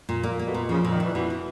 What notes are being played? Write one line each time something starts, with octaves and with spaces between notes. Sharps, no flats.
A#2
A#2 A#3
A#3
B2
A#2
C#3 F3
D3
A#2
D#3
E3 D4
B2 E3
B2